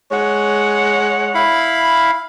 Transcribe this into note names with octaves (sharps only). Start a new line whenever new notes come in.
G#3 C#5 F#5
E4 F5 B5